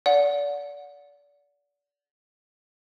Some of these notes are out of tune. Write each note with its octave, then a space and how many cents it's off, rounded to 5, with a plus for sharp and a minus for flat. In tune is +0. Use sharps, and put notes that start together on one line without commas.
D5 -30 F#5 -25